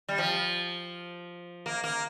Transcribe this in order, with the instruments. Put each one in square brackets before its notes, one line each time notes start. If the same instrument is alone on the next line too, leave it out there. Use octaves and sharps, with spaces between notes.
[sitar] G3
F3
A#3
A#3